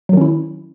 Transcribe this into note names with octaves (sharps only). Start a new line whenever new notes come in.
D#3 F#3 C#4 E4